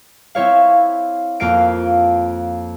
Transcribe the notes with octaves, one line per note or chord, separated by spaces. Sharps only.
C4 E4 C#5 F5
F2 A#3 F5 C7 D7